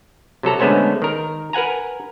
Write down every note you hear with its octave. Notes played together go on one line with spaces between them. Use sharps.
C3 F#3 A4 A#5
D3 G#3 A3 B3 C#4 C5
D#3 A#4
A#4 B4 F#5 G#5 A#5